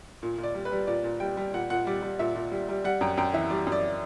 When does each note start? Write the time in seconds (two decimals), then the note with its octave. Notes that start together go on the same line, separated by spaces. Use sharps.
0.23 A#2
0.38 A#2
0.43 D5
0.55 G3
0.65 B4
0.72 G3
0.87 A#2 D5
1.04 A#2
1.20 G3 G5
1.37 G3
1.53 A#2 F#5
1.70 A#2 F#5
1.87 G3 D5
2.03 G3
2.19 A#2 E5
2.35 A#2
2.51 G3
2.69 G3
2.84 G3 F#5
3.01 F#2 G5
3.17 F#2 G5
3.34 E3 E5
3.50 G3 D5
3.67 F#2
3.72 D5